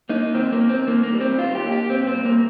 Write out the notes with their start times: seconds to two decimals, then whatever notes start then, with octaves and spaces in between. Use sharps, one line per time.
0.09 A#3 D#4
0.34 D#3 C4
0.53 A#3
0.62 D#3
0.69 C4
0.87 D#3 A#3
1.03 A#3
1.13 G3
1.21 C4
1.38 D#3 F4
1.55 G4
1.65 A#3
1.72 G4
1.90 A#2 C4
2.07 C4
2.16 G3
2.25 A#3